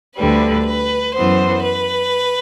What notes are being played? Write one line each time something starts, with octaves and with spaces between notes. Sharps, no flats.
D2 D3 G3 B4
B4
F#2 E3 B3 C5
B4